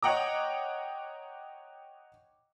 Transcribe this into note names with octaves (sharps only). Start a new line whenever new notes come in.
C#5 D#5 F#5 G5 A#5 D6